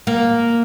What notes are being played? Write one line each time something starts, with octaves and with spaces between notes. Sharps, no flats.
A#3